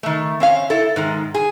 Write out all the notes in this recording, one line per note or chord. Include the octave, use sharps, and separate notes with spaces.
D#3 A3
C4 C#4 F5
E4 A4
G#2 D#3 G#3
G#4